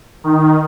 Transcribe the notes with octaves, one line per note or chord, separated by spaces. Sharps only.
D#3